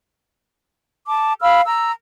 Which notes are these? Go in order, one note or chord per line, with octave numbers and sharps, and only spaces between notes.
A5 D6
F5 B5 E6 F6
A#5 E6